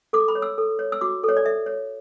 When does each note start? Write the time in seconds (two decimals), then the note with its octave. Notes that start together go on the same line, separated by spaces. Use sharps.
0.13 A4 D6
0.28 B5
0.35 C#5
0.42 E6
0.58 A4
0.79 C#5
0.92 E6
1.01 F#4 D6
1.23 A4
1.29 C#5
1.37 D5
1.45 A4 E5
1.66 C#5